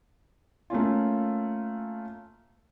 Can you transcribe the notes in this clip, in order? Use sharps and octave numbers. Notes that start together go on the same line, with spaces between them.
A3 A#3 C#4 F4